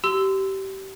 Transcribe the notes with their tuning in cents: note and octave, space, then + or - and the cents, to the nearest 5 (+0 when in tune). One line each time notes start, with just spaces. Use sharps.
G4 -25 C6 -30 E6 +0